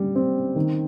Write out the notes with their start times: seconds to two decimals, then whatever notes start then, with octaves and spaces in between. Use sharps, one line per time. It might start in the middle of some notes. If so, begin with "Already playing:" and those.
Already playing: G3
0.16 C4
0.56 D#3